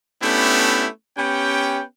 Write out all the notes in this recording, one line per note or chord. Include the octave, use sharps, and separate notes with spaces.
A3 B3 C#4 D4 E4 G4
B3 C#4 G4 G5